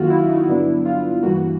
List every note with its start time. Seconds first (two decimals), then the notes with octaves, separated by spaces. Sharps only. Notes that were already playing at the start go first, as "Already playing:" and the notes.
Already playing: F#2 D#3 F#3 A#3 F4 F#4
0.10 E4
0.29 D#4
0.47 G2 D3 F#3 B3 D4 E4
0.85 F4
1.23 G2 E3 G3 A#3 F#4